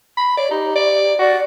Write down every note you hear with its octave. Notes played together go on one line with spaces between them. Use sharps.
B5
C#5 D5
D#4 G4
D5
F#4 D5